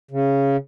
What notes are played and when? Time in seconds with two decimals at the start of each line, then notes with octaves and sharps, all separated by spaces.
0.11 C#3